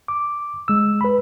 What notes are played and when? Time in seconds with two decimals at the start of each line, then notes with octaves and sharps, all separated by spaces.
0.08 D6
0.68 G#3 E6
1.01 B4 B5